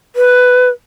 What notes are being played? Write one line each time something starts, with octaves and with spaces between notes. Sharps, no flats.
B4